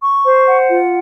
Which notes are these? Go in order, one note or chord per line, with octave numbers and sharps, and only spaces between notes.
C#6
C5
F#5
F4